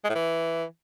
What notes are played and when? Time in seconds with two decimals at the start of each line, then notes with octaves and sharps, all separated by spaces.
0.04 G#3
0.10 A2
0.15 E3